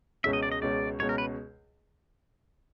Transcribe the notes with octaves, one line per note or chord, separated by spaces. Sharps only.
C#2 B2 G#3 C#4 E5
D#5
D5
D#5
C#2 B2 G#3 C#4 D5
C#2 B2 G#3 C#4 C#5
A#4
B4